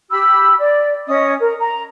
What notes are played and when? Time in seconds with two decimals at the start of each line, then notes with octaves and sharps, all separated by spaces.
0.10 G4 B5 E6
0.58 D5
1.07 C#4 D#5 D#6
1.40 A#4
1.59 A#5